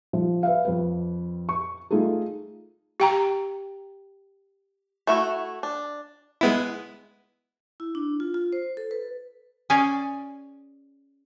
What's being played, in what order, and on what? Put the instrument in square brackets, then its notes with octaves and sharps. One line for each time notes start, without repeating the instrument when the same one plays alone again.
[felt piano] F3
B4 E5 F5
F2 B4
C#6
A3 D#4 F4 G#4 A4
[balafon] G4 G5 A#5
[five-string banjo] A3 E4 F#4
D4
[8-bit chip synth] G#3 B3 E4
[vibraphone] E4
D4
F4
F4
C5
A4
B4
[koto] C#4 G#4 D5 G#5